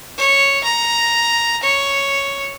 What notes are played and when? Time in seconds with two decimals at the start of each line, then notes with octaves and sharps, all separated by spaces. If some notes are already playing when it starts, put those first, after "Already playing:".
0.18 C#5
0.64 A#5
1.63 C#5